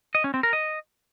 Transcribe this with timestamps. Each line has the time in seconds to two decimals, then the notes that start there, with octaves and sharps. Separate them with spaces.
0.15 D#5
0.24 C#4
0.34 C4
0.43 A#4
0.53 D#5